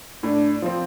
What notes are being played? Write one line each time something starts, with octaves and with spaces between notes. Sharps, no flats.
A2 D4
F3 C4